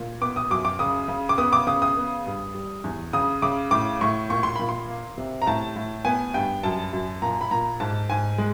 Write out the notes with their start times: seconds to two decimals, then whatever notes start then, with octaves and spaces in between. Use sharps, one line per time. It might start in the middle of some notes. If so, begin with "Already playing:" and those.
Already playing: A#2
0.21 B3 D6
0.36 D#6
0.50 F#2 D6
0.65 D6
0.79 C#3 D#6
1.08 C#3
1.29 D6
1.38 B3 D#6
1.53 D6
1.67 C#3 D#6
1.82 D#6
1.97 B3
2.26 G2
2.55 G3
2.84 E2
3.13 C#3 D#6
3.42 C#3 D6
3.71 A2 D6
4.01 A2 C#6
4.30 A#2 C#6
4.43 C6
4.56 A#2 B5
4.69 C6
4.88 A#3
5.18 C3
5.42 A#5
5.47 A2 A5
5.76 A2
6.05 B3 G#5
6.34 G2 G5
6.63 F#2 A5
6.93 F#2
7.22 A#2 A#5
7.41 B5
7.51 A#2 A#5
7.80 G#2 A5
8.10 G#2 G#5
8.38 G#3